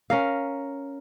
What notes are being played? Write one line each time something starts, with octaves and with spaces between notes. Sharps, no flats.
C#4 A#4 F5